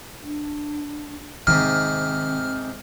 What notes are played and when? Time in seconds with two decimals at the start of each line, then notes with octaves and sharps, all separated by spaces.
0.23 D4
1.47 G#2 C3 D#3 C4 F6